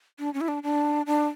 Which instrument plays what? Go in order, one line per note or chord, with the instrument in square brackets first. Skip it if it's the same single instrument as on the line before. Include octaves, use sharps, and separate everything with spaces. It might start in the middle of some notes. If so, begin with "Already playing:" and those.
[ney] D4
C#4
E4
D4
D4
D4